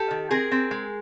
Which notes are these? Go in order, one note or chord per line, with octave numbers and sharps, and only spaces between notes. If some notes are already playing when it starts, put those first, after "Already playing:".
Already playing: G4 A4
D#3
C4 G#4 A#4
C4
G#3